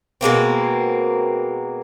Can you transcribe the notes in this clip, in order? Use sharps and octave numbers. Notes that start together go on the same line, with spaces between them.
B2 G#3 A#3 C4